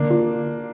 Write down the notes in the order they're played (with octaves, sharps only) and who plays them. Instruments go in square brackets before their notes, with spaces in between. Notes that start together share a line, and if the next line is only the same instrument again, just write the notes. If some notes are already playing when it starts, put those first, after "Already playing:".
Already playing: [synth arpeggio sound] D3 [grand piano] A#3 D4
[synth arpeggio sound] F4